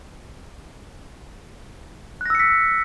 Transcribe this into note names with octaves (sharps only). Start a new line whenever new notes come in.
E6 F#6 A#6 B6 C#7